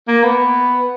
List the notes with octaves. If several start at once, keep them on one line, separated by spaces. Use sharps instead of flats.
A#3
B3